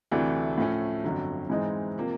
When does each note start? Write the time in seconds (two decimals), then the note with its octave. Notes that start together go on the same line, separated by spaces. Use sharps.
0.12 D2 C3 E3 A3 D4
0.58 A2 F3 A3 C#4
1.04 G1 F2 D3 F#3
1.50 G#2 E3 G#3 C4 D#4
1.98 C3 F3 A#3